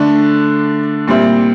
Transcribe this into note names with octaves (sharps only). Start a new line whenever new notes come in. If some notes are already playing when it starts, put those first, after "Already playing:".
Already playing: D3 A3 D4
A#2 G3 C4 E4